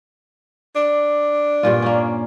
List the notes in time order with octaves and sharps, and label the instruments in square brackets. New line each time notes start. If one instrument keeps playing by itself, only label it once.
[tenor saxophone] D4
[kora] G2 A#2 F4
A#3 C#4